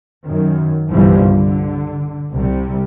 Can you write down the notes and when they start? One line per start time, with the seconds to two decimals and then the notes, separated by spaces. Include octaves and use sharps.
0.23 F#2 D#3
0.90 G1 C2 E3 F3 G3
1.27 D3
2.33 C2 C3 G3